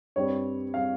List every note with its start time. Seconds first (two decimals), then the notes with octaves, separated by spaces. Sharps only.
0.16 G2 G3 C4 C#5
0.74 G3 C4 F5